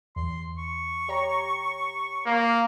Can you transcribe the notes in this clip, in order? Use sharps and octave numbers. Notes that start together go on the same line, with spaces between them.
E2 C6
C#6
G4 C#5 A#5
A#3 F5